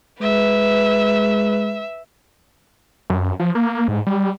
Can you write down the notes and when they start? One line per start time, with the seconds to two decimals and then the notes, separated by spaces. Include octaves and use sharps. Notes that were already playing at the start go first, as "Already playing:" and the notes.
0.21 G#3 B4 E5
3.10 F#2
3.40 F3
3.55 A#3
3.88 G#2
4.07 G3